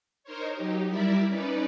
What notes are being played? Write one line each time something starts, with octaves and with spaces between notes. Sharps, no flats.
D#4 A#4 C5 C#5
F#3 D#4 G4
G3 E4 A#4 D5 E5
C#4 D#4 B4 D5